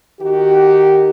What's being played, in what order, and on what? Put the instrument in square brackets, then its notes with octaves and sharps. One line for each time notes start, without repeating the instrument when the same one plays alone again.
[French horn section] D#3 F#4 G4